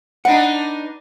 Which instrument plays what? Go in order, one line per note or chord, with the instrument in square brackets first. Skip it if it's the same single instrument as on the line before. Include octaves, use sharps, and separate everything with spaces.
[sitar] B3 D4 D#4 [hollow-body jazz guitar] F#5